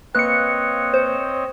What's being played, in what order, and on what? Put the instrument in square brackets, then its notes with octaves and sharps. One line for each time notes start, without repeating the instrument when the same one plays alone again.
[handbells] A#3 B4 [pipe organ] C4 C#5 D#5 [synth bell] F#6 C#7
[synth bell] C5